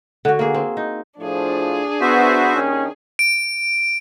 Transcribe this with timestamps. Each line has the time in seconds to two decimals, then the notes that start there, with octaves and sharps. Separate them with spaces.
0.25 D3 F#4
0.39 A#3 G#4
0.54 C4
0.77 D#4
1.19 A2 F3 D4 G#4
2.01 B3 F#4 C5 E5
2.54 D#2 D#3 C#4
3.19 D7